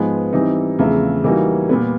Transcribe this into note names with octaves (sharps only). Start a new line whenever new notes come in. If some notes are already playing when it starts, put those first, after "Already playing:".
Already playing: G#2 F3 G#3 B3
E3 G3 C4 D#4
E2 C#3 F3 A3 C4
E3 G3 A#3 D#4 F#4
A#2 G3 B3